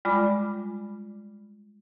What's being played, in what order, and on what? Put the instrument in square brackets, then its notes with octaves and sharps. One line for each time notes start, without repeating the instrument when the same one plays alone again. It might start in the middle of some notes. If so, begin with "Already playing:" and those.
[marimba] G3 G#3 F4 D5 B5 D6